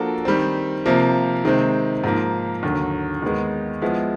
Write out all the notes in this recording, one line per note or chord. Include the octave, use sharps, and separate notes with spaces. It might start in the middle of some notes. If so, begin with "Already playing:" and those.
Already playing: F3 A#3 D4 F#4 A4
D#3 G3 C4
C3 F3 A#3
C3 D#3 G#3 C4
G#2 F3 A#3
D#2 D3 F#3
D#2 D#3 G#3 B3
F3 G#3 B3 E4